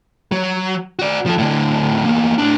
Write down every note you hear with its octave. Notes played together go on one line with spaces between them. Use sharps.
F#3
F#4 D5
F3 A4
A2 D3
E2 A#3
A2 D4